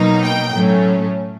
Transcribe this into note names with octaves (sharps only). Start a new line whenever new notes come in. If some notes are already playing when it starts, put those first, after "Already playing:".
Already playing: B2 F#3 A#3 D#4
G5
A2 F#3 A3 C#4